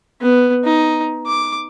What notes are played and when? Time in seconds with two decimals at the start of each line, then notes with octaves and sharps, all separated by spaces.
0.21 B3
0.64 D#4
1.26 D6